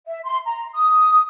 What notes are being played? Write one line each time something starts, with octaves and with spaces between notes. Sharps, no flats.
E5
C6
A#5
D#6